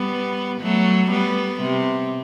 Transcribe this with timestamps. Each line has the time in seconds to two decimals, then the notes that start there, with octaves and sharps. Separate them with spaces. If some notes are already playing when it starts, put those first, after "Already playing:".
Already playing: G3 B3
0.62 F#3 A3
1.11 G3 B3
1.61 C3